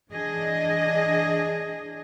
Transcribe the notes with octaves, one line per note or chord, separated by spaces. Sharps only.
E3 D4 G#4 D#5